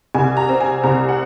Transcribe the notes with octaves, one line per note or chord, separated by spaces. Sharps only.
C2 G#5
A#5
C4
G#5
C2 A#5
F#5